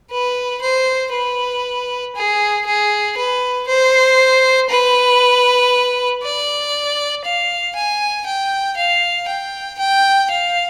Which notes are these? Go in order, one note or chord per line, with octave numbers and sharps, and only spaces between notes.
B4
C5
B4
G#4
G#4
B4
C5
B4
D5
F5
G#5
G5
F5
G5
G5
F5